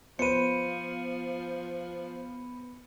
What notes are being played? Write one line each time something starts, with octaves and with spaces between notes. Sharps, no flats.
F3 B3 B4 C5 C#7 D#7